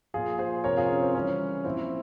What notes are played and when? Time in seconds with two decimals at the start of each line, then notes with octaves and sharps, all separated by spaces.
0.14 A#2 F3 F4 G#4
0.39 G#4 C5
0.64 C3 F3 A#4 C#5
0.77 F4 G#4
0.89 C#4
1.02 C4
1.15 C#3 E3 G3 C#4
1.64 A#2 F3 C4 E4